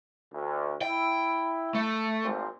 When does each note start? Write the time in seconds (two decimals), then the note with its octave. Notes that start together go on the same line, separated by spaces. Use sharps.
0.32 D2
0.82 E4 G5
1.75 A3
2.23 G#1 A#2 C4